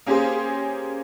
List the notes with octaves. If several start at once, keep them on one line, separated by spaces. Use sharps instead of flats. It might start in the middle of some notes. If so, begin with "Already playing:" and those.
A#3 C#4 G4 G#4 C5